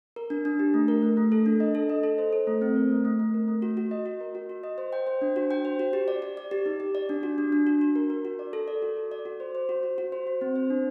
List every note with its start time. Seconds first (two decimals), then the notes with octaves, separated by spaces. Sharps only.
0.16 A#4
0.30 D4
0.45 D4
0.59 G4
0.74 A3
0.88 A#4
1.03 A3
1.17 A3
1.32 A4
1.46 D4
1.60 D#5
1.75 A4
1.89 D#5
2.03 A4
2.18 C5
2.33 A4
2.47 A3
2.62 C4
2.76 A#4
2.91 A3
3.05 A3
3.19 A3
3.34 A#4
3.48 A3
3.62 F#4
3.77 F#4
3.91 D#5
4.06 F#4
4.20 A#4
4.35 F#4
4.49 F#4
4.63 D#5
4.78 C5
4.93 G5
5.07 C5
5.22 D4
5.36 F#4
5.51 G5
5.65 C5
5.79 F#4
5.93 G4
6.08 D5
6.22 D5
6.37 D5
6.51 G4
6.66 D#4
6.80 G4
6.95 D5
7.09 D4
7.23 F#4
7.38 D4
7.52 D4
7.67 F#4
7.81 F#4
7.96 A#4
8.10 A#4
8.25 F#4
8.39 D5
8.53 A4
8.68 D5
8.82 F#4
8.97 A4
9.11 D5
9.25 F#4
9.40 C5
9.55 C5
9.69 F#4
9.83 F#4
9.98 F#4
10.12 C5
10.27 F#4
10.41 C4
10.56 C5
10.70 D4